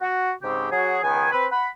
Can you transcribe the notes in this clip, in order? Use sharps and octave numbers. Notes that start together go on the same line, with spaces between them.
F#4
G#2 C#3 C4 G4
F#3 F#4 G#4
C#2 D#3 B3 G#5
C4 B4
F#5 B5